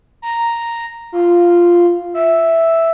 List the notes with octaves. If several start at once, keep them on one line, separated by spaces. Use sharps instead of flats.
A#5
F4
E5